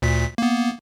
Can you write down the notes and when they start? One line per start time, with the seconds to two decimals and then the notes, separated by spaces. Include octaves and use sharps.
0.02 D2 A#2 B6
0.38 A#3 B3